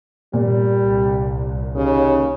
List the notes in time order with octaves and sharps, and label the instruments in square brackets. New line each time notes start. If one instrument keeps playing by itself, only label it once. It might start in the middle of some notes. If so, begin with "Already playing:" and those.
[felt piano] A#2 [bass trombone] G3
[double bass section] C2
[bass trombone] D#2 [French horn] C#3